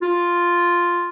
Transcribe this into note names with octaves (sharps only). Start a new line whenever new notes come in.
F4